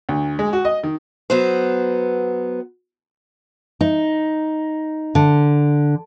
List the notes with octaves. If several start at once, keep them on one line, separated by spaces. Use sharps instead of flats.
D2
G#3
F#4
D#5
D#3
F#3 B3 C5
D#4
D3